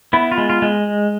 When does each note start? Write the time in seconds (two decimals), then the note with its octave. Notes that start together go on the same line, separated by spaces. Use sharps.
0.13 B3 E4
0.32 F4
0.38 G#3
0.50 F4
0.62 G#3